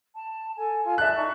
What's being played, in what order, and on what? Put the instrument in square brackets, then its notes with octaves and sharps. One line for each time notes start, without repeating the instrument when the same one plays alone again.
[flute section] A5
A4 G#5
F4 G#5
[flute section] D5 A5 [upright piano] E5 F#6
[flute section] D#4 C#6